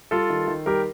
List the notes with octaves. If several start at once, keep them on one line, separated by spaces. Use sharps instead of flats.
G3 F4 A4
D#3
D#3
G3 G4 A#4